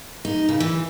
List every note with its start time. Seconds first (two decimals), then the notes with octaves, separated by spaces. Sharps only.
0.25 D#4
0.49 C#3
0.60 E3